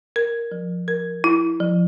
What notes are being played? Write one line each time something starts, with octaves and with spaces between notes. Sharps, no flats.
A#4
F3
A#4
E4
F3